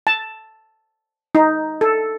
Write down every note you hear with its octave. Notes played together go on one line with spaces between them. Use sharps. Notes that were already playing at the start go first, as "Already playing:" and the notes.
A5
D#4
A4